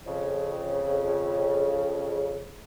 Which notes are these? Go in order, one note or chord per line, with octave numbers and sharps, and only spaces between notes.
F2 C#3